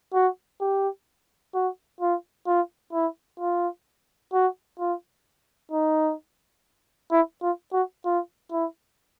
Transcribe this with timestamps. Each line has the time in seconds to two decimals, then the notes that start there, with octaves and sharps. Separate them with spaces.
0.13 F#4
0.60 G4
1.54 F#4
2.00 F4
2.46 F4
2.92 E4
3.40 F4
4.33 F#4
4.79 F4
5.71 D#4
7.11 E4
7.42 F4
7.73 F#4
8.05 F4
8.51 E4